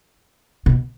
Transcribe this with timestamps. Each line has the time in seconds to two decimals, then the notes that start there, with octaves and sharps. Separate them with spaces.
0.66 B2